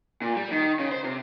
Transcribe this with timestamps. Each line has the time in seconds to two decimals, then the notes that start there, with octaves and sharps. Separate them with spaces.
0.22 A#2
0.36 G3
0.52 D#3
0.79 C#3
0.92 C5
1.04 C3